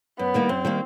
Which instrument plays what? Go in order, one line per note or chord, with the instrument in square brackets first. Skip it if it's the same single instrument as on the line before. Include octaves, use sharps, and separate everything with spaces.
[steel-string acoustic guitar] F#2 [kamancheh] B3
[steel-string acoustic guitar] D#3 G3 A#3
[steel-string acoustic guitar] F#2 [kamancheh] C4
[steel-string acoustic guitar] D#3 G3 A#3